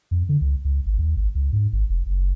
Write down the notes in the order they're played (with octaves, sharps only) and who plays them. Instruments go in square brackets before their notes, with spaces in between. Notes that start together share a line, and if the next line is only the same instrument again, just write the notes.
[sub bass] F2
D3
C#2
C#2
G#1
D#2
G#1
C#2
G#2
G#1
F1
F#1